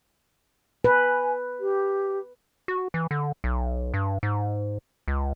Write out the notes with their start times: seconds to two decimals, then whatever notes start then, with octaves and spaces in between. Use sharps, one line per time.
0.84 B4 G#5
1.59 G4
2.68 F#4
2.94 E3
3.11 D3
3.44 B1
3.94 G2
4.23 G#2
5.08 C#2